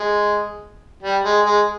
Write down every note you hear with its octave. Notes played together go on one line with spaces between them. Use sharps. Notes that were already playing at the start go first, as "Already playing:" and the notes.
Already playing: G#3
G3
G#3
G#3